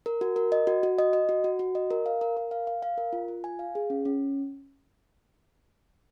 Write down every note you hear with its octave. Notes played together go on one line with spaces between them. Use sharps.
A#4
F#4
A#4
D#5
F#4
F#4
D#5
D#5
F#4
F#4
F#4
D#5
A#4
F5
A#4
A#4
F5
F5
F5
A#4
F4
F4
G#5
F5
G#4
C#4
C#4